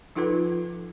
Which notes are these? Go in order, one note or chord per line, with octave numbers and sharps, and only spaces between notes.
F3 D#4 F4 A4 B4